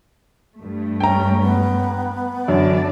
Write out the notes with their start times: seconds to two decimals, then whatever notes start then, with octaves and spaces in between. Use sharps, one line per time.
0.57 G2 A3
1.00 C#4 G5 A#5
1.41 B3
2.48 F#2 D3 D4 D5